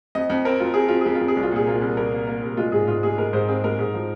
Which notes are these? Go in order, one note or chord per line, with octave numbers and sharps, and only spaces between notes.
F2 D#5
F2
C4 A#4
F2 F4
C4 G#4
F2 F4
F2 G#4
F4
F2
G#4
C2
F4
A#2 G#4
A#3 F4
C2
C2 A#4
A#3
A#3
C2
G#3 F4
G#2 G#4
G#2 F4
G#3 G#4
G#3 A#4
G#2 C5
C4 G#4
G#3 A#4
G#2
F3